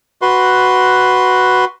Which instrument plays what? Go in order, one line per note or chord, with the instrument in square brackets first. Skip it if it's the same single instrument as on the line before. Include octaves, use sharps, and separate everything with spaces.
[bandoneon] F#4 B4 C6